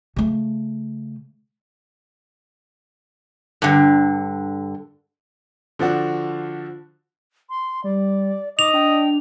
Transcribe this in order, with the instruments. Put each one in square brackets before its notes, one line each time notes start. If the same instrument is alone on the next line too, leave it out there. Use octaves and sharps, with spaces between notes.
[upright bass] C#3 A3
[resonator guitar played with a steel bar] G2 D3
[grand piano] D3 F3 D4 F#4
[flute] C6
[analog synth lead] G3 [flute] D5
[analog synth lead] D#4 [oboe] D#5 [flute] D6 [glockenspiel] F7
[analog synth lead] D4 [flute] G5